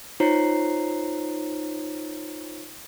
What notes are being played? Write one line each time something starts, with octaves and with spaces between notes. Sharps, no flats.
D#4 F4 C5 C#5 A#5 C7